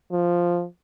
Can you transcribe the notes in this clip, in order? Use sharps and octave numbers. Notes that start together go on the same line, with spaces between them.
F3